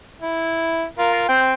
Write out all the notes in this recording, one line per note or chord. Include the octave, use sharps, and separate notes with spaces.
E4
F4 A#4
C4 G5